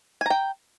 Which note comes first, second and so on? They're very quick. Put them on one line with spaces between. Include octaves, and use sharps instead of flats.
G#5 A#5 G5